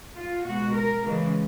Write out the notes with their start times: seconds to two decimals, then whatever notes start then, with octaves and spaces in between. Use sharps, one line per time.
0.15 F4
0.44 B2 G#3 F#4
0.74 A#4
1.04 C#3 E3 G#3